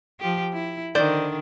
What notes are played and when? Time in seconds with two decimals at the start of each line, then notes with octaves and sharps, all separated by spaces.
0.20 F3 G4
0.53 E4
0.95 D3 D#3 C5 D5